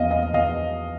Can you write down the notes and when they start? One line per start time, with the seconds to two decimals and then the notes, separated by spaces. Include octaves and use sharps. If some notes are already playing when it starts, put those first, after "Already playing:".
Already playing: E2 F3 D#5 F5
0.11 D#5 F5
0.34 E2 D#5 F5